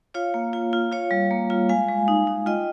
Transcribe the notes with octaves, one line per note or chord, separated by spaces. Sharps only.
F4 C#5 F5
A#3
F4
F4
F4 C#5 F5
G3
A#3
F4
G#3 F5 G#5
G#3
D#4
D#4
F4 D#5 G5